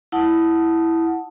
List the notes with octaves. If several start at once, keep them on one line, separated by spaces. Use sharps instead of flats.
E4 F#5 A5 D#6